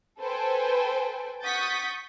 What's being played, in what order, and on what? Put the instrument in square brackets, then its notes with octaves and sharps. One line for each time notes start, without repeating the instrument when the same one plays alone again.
[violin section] A4 B4 C5 G5 G#5
F#5 C#6 D#6 G6 A6 B6